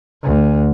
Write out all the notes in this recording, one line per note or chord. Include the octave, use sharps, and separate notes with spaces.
D2